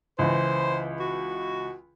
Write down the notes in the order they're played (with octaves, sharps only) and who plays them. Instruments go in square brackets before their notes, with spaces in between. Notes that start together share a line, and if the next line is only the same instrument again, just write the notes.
[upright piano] C#2 E3 [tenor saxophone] C5
[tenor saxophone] F#4